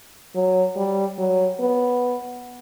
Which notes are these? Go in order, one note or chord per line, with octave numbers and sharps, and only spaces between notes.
F#3
G3
F#3
B3